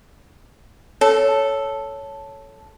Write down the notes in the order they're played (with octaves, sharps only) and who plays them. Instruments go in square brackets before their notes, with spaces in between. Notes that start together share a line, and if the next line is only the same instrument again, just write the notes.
[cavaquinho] A4 [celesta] C#5